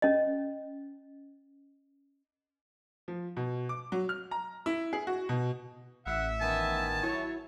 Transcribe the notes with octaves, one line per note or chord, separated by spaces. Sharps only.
C#4 D#5
F3
B2
D6
F#3
F6
A#5
E4
G#4
F#4
B2
A1 E5 F#5
D#3 B3 G#5 A5
F#3 E4 C#5